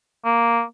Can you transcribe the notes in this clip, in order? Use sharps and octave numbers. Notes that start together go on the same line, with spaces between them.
A#3